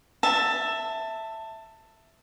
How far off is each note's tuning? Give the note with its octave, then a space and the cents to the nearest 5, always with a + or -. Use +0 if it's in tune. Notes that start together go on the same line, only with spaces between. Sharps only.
E5 +0 A5 +15